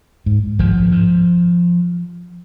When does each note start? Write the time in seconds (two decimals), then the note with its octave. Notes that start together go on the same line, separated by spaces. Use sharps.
0.26 G#2
0.59 G#1 F3
0.92 G#2